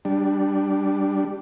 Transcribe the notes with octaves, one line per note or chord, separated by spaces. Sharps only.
G3 D4